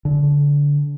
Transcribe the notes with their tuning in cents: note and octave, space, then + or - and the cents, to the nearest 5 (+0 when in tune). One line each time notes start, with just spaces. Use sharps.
D3 -25